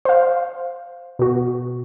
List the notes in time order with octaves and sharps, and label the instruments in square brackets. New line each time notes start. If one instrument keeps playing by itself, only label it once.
[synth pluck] C5 F5
B2 F#4